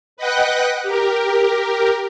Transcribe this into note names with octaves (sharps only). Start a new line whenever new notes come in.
B4 D#5 F#5 G5 F#6
G4 A#4